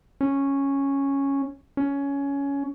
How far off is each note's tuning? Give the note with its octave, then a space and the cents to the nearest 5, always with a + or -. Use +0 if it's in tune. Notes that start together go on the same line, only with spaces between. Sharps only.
C#4 -5
C#4 +15